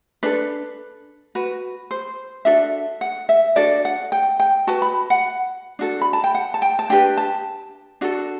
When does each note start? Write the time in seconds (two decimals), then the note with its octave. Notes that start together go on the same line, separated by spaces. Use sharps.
0.23 D4 A4 B4
1.35 F#4 B4
1.91 C5
2.45 D4 F#4 A4 E5
3.01 F#5
3.29 E5
3.56 D4 F#4 A4 D5
3.85 F#5
4.12 G5
4.40 G5
4.67 F#4 B4 A5
4.82 B5
5.10 F#5
5.79 D4 F#4 A4
6.02 B5
6.13 A5
6.24 G5
6.35 F#5
6.54 A5
6.62 G5
6.79 A5
6.90 D4 G4 B4 G5
7.17 A5
8.01 D4 F#4 A4